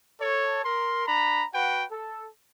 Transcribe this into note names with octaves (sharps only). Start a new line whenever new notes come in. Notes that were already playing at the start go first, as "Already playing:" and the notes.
A4 C#5
A#4 C6
D4 A#5 B5
F#4 B4 F#5 G5
A4